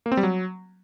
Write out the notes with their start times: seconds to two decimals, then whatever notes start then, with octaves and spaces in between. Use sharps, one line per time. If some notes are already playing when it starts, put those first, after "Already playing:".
0.06 A#3
0.12 C4
0.17 G3
0.23 F#3